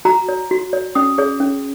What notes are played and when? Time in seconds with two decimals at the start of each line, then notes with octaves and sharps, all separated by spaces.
0.05 F#4 A#5
0.29 C#5
0.51 F#4
0.73 C#5
0.95 C#4 D#6
1.18 G#4 C#5
1.40 C#4